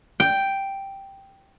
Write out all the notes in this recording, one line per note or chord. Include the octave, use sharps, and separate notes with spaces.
G5